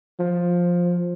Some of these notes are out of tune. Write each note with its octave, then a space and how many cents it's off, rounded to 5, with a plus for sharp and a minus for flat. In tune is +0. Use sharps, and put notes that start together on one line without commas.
F3 +10